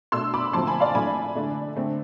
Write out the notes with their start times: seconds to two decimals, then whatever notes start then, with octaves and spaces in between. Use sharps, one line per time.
0.12 B2 A3 D4 C6 E6
0.34 B5 D6
0.53 D3 F3 A3 C4 A5 C6
0.67 G#5 B5
0.80 D5 F5
0.95 E3 A3 D4 G#5 B5
1.35 D3 A3 D4
1.76 D3 A3 C4